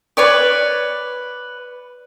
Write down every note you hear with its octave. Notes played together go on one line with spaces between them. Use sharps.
B4 C#5 D5 D6